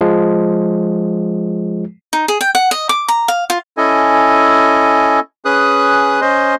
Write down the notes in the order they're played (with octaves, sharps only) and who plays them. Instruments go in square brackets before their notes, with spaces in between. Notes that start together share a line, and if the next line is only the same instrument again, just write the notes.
[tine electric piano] F3 G#3
[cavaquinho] D#4
G#4
G5
F#5
D#5
D6
A#5
F5
F4
[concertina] C#4 E4 A4 D#5 G#5
C#4 G#4 B4 D#6 F#6
C#4 C5 D#5 C6